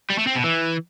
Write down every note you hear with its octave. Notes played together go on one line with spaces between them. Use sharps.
G3
A3
C4
B2
E3